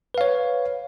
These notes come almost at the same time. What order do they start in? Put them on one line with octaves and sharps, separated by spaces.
B4 F5 C#5